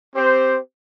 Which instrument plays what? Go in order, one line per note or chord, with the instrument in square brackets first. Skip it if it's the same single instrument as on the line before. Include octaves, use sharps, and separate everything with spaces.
[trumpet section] C4 G4 C5